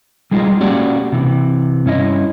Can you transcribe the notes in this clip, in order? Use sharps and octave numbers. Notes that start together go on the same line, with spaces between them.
G3 G#3 D#4 F4
A#3 C#4 F#4 G4 D5
C3 E3
G2 C#4 E4 D#5